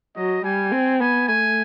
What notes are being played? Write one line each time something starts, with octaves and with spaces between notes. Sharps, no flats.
F#3 D#5
G3 G#5
C4
B3 G#5
A3 G#5